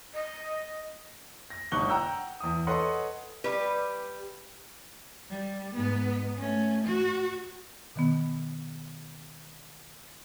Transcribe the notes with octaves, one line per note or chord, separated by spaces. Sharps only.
D#5
A#6
G1 G2 D#4 C#6 F#6 G7
F#5 G5 A#5 E6 G6
E2 D#6
A4 B4 C#5 D#5 F#5 C6
G3 B4
G3
G#2 B3
A3 C#4
F#4
B2 D#3 B3